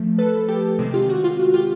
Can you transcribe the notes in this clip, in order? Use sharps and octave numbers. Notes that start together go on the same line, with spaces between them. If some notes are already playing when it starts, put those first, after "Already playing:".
Already playing: F3 A3
A4 B4
G4 A4
C3 D#3 G#3 C4
F4 G4
F#4
F4
F#4
F4 G4